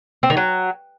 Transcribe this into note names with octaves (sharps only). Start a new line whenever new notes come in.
C4
D#3
F#3